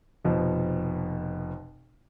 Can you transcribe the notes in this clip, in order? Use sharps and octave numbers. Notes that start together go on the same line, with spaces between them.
F1 B2 F3